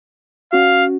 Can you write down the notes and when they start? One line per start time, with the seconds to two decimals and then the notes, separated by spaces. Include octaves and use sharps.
0.53 C#4 F#4 F5